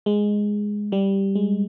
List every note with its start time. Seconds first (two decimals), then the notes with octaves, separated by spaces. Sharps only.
0.06 G#3
0.92 G3
1.35 G#3